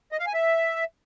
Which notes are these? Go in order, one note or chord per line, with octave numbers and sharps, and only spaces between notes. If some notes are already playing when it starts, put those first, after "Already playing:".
D#5
F5
G#5
E5